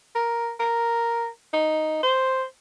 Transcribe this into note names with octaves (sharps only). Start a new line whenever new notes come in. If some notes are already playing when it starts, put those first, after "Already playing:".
A#4
A#4
D#4
C5